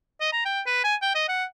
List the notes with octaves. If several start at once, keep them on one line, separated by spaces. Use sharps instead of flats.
D#5
A#5
G5
B4
G#5
G5
D#5
F#5